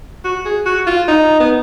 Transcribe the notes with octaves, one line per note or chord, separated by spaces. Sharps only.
F#4
G#4
F#4
F4
D#4
B3